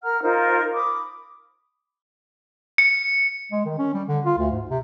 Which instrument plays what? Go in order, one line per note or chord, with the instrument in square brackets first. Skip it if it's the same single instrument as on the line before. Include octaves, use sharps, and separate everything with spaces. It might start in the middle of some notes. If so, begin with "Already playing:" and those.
[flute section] A#4 F#5 A#5 F6
D#4 F4 A#4 C5
B5 D6 D#6
[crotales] C#7
[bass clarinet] G#3
D#3
C#4
G3
D3
F4
D2
G#2
C3